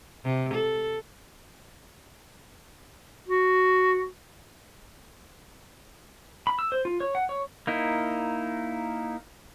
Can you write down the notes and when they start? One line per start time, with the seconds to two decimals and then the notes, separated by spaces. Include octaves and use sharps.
0.25 C3
0.54 A4
3.28 F#4
6.47 B5
6.59 E6
6.72 C5
6.85 F4
7.00 C#5
7.15 F#5
7.29 C#5
7.67 A#3 D#4 E4